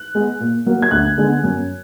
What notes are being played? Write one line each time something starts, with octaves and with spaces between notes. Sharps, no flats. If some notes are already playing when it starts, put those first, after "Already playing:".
Already playing: F#6
G#3 B3
A#2
F#3 A#3
G#6
D2 F#6
D3 G#3 B3
F#2